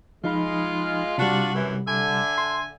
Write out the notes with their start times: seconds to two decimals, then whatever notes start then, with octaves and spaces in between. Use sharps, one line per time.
0.24 F3 G#3 D#4 F4 B5
1.18 C3 G3 D4 F4 F#4
1.55 F#2 E3
1.87 D3 E5 G#5
2.38 C6